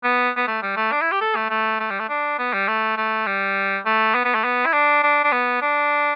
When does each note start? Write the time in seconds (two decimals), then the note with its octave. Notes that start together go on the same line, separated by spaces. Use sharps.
0.04 B3
0.36 B3
0.47 A3
0.62 G3
0.77 A3
0.92 D4
1.01 E4
1.11 G4
1.21 A4
1.36 A3
1.50 A3
1.80 A3
1.90 G3
1.99 A3
2.09 D4
2.38 B3
2.53 G3
2.68 A3
2.97 A3
3.27 G3
3.86 A3
4.15 B3
4.25 B3
4.34 A3
4.44 B3
4.66 E4
4.73 D4
5.03 D4
5.24 D4
5.32 B3
5.62 D4